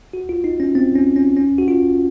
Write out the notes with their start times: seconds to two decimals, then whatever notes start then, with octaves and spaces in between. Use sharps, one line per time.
0.13 F#4
0.29 F4
0.44 D#4
0.60 C#4
0.75 C4
0.96 C#4
1.16 C#4
1.37 C#4
1.58 F#4
1.68 F4